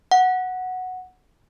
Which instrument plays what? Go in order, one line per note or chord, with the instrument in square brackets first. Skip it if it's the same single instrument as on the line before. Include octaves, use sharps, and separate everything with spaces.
[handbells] F#5